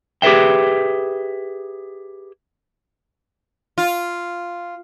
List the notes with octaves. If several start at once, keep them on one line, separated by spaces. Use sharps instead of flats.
G4 G#4 B4 E5 G5
F4